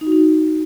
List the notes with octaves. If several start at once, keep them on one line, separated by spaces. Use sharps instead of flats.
D#4
F#4
D#4